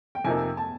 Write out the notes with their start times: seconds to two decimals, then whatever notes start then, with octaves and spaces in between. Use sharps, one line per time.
0.15 G5
0.25 F2 C3 F3 A#3 D#4 G#5
0.57 A5